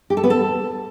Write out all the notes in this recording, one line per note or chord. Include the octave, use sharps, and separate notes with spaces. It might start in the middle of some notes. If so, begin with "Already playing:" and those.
G4
A4
B3
A4